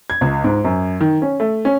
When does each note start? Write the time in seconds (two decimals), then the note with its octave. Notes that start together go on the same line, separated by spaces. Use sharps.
0.10 G#6
0.21 C#2
0.44 G#2
0.65 F#2
1.00 D#3
1.22 C#4
1.40 A3
1.65 C#4